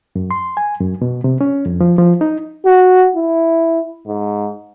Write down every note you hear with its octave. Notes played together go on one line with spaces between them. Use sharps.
F#2
C6
G#5
F#2
B2
C3
C#4
F2
F3
F3
D#4
F#4
E4
G#2